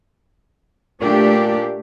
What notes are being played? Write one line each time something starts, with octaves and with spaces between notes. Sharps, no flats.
A#2 A3 D4 G4